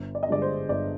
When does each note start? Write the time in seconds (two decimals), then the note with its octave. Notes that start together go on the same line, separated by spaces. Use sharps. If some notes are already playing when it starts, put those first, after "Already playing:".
Already playing: G1
0.15 D5
0.23 D#5
0.28 G2 D3 G#3 D4 D5
0.42 C5
0.69 G1 D5